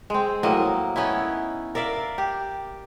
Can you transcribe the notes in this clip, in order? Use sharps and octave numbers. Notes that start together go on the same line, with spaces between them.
G#3 C4
A2 F#3 A#3 D#5
B3 C#4 D#4 E4
A#4 D5 E5 F5
G4